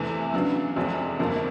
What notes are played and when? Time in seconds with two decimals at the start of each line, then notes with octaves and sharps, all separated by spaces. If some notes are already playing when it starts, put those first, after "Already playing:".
Already playing: E2 C3 E3 A3
0.34 C#3 F#3 B3 D4
0.76 F1 E2 C3 F3 G#3
1.19 G1 F2 C3 F3 A#3